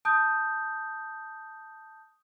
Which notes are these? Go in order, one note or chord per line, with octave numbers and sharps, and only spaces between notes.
A5 D#6 G6